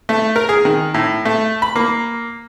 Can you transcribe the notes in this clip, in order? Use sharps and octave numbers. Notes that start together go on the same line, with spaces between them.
A3
A#4
G#4
D#3
A2
A3
B5
A#3